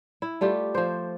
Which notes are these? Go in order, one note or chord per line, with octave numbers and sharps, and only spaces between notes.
E4
G3 A3 F4 G4
F3 C5